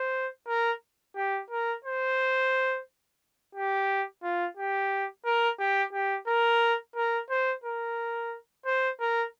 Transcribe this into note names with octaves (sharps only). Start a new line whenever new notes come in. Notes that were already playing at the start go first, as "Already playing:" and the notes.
Already playing: C5
A#4
G4
A#4
C5
G4
F4
G4
A#4
G4
G4
A#4
A#4
C5
A#4
C5
A#4